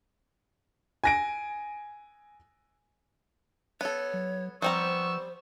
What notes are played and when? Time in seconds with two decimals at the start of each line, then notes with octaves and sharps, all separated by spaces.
1.04 G#5 A#6 D7
3.81 B3 A4 C#5
4.13 F#3
4.62 F3 G3 B3 C4 C5 A#5 C#6 E6